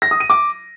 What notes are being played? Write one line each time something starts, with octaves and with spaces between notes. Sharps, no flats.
A#6
D#6
D#7
D6